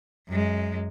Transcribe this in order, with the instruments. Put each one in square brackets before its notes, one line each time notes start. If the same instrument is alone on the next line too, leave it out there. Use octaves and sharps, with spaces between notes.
[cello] F#2 G#3